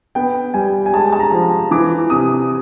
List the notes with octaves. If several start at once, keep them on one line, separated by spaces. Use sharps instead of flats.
B3 G5
G3 G#5
G#5
G#3 A5
A5
A#5
F3
E3 D6
C3 D#6